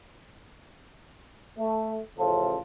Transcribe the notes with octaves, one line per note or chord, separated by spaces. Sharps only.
A3
A1 A2 C#3 F3 F4 A4